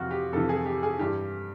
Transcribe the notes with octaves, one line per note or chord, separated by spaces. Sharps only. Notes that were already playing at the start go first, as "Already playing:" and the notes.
Already playing: F2 C3 E3 F4 F#4
G4
F2 C3 E3 A4
G#4
G4
G#4
G2 E3 G4